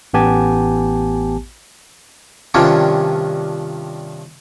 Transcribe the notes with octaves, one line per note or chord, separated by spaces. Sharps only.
A1 B3 G4 G#5 A5
G2 C3 D#3 F3 C#4 D4